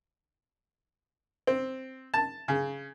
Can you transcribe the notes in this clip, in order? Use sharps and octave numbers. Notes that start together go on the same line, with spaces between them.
C4
A5
C#3